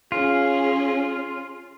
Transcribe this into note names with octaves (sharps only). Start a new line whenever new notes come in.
C#4 F4 G#4